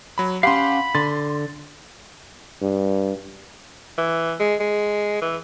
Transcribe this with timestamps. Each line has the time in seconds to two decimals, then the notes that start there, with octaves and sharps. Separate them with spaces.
0.18 F#3 B5
0.43 C#4 G4 F5 F#5 B5 C6
0.95 D3 C6 A6
2.62 G2
3.98 E3
4.40 G#3
4.60 G#3
5.22 E3